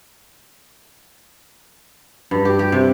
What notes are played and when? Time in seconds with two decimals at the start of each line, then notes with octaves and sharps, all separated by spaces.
2.31 G2
2.45 G4
2.59 G4
2.72 C3